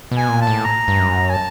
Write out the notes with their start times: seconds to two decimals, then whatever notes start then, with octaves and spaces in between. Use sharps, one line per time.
0.11 B2
0.17 G#5
0.29 A#2
0.41 A5
0.47 A2
0.65 A#5
0.88 G2
0.99 F#2
1.30 G#5
1.34 A5